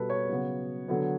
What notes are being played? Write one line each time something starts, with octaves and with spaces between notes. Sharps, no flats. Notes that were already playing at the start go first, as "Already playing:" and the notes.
Already playing: B2 G3 B3 A4 B4
C#5
C#3 F#3 B3
D3 F#3 B3